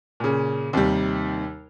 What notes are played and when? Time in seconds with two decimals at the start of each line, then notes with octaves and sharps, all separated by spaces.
0.20 A#2 C#3
0.73 D#2 C3 D#3 G3